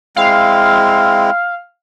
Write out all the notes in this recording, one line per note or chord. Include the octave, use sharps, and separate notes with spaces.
G#3 C4 E4 F5